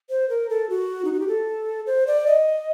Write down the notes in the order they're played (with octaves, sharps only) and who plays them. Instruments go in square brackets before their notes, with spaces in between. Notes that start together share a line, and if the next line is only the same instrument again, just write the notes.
[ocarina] C5
A#4
A4
F#4
D#4
F#4
G4
A4
C5
D5
D#5